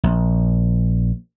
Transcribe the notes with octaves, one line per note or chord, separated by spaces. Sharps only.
A#1